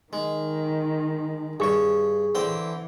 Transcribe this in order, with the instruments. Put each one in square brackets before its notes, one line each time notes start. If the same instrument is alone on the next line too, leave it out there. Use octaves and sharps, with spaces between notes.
[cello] D#3 [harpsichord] G#3
[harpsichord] G2 C#5 [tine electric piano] G#4 C#6
[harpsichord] D3 C4 G5 [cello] E3